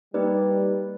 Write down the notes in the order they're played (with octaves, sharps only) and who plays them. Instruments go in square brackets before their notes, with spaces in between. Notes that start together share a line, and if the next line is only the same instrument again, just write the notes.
[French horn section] G3 [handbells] A#3 D#4 G4 B4 D5